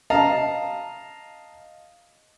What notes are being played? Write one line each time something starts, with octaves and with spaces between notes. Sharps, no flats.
D#5 F5 A5 A#5